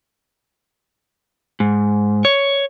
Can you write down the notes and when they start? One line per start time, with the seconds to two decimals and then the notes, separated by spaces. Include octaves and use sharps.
1.60 G#2
2.25 C#5